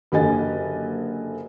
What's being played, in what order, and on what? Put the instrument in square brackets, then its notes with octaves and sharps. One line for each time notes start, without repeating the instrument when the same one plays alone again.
[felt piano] F#1 D3 G4 D#5 G#5 A6